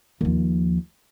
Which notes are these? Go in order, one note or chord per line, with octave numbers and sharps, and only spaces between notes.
D#2 F3